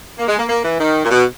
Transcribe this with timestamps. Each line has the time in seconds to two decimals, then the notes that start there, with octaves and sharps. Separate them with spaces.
0.19 A#3
0.28 G#3
0.39 A#3
0.49 A#3
0.64 E3
0.80 D#3
1.05 A#2
1.11 B2